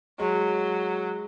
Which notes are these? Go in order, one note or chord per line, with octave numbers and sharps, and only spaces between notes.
F#3 G#3